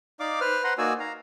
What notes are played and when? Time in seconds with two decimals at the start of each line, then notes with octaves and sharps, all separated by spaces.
0.20 D#4 D5 F5 D6
0.41 B4 C5 F6
0.64 B4 C5 F#5 A#5 C6
0.78 A#3 D#4 F#4 D5 G#5 E6
1.00 F5 A#5